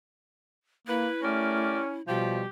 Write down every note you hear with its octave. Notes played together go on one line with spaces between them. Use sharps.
A#3 E4 B4
A3 C#4 G4 A#4 D5
B2 F3 G3 G4